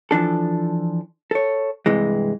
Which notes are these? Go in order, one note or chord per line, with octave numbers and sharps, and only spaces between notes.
E3 F3 D4 A4
A4 C#5
G2 C3 E3 G#3